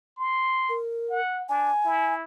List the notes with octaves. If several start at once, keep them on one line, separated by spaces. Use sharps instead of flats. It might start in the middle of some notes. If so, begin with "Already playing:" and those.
C6
A#4
F#5
D4 G#5
E4